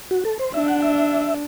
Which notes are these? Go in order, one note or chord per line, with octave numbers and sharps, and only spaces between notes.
F#4
A4
C5
D4 E5
F#5
E5